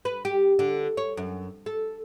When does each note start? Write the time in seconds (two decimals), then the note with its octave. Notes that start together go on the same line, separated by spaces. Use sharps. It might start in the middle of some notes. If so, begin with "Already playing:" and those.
0.05 B4
0.25 G4
0.59 D3
0.97 C#5
1.17 F#2
1.66 A4